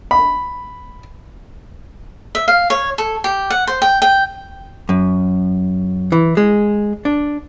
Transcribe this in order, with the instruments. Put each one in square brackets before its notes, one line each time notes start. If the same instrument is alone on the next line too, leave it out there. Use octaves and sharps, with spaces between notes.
[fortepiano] B5
[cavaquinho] E5
F5
C#5
A4
G4
F#5
C5
G5
G5
[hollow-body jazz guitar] F#2
E3
G#3
D4